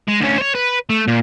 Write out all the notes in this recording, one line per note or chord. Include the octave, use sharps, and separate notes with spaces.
G#3
D2 C#4
C5 C#5
B4
A3
A#2